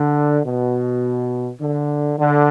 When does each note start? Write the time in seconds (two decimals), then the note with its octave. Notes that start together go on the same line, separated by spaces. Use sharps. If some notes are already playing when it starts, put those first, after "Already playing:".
Already playing: D3
0.44 B2
1.60 D3
2.18 D3